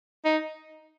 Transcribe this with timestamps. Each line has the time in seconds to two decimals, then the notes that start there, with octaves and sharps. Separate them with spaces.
0.25 D#4